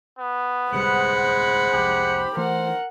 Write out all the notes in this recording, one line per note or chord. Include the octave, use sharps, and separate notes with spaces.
B3
D1 C2 G3 G#3 C5 F#5 B5
C2 F2 G4
E3 A3 A#4 C5 F#5